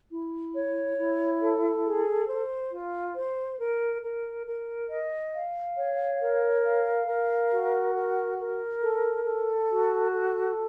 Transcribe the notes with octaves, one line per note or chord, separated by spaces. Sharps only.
E4
C#5
E4
A4
G#4
C5
F4
C5
A#4
A#4
A#4
D#5
F5
C#5
A#4
F5
A#4
F#4
A#4
A#4
A4
A4
F#4
A4